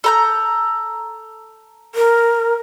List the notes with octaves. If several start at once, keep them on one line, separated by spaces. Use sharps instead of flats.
A4 A#5 G6
A#4